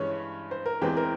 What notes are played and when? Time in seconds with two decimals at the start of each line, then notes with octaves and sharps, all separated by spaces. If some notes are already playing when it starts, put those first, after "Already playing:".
Already playing: G2 E3 G#3 C#4 C#5
0.51 C5
0.66 A#4
0.81 E2 E3 G#3 C4 G4
0.97 A#4